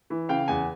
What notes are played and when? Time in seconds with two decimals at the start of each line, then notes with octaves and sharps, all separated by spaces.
0.10 E3
0.29 C#3 F5 G5
0.48 E2 F#5 G#5